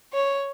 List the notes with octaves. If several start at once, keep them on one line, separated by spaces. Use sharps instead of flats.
C#5